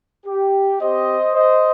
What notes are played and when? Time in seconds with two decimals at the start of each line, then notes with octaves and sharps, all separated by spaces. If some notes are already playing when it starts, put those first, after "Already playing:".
0.26 G4
0.80 C4 G4 C5 D#5
1.35 C5 D#5